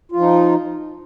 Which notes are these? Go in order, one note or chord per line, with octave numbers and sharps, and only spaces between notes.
F3 D#4 F4